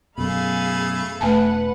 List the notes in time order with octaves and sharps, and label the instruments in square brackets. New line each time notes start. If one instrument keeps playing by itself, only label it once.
[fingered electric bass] F#2 B2 [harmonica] A3 B5 [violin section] G#4 F5
[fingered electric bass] E1 [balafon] A3 G#5 A5 [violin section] B4 F#5